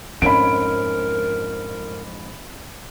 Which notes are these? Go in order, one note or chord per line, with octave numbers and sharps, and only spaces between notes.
F2 G#2 C#4 D4 A#4 B5 D7